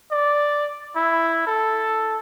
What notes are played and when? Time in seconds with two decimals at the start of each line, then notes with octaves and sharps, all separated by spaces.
0.12 D5
0.96 E4
1.47 A4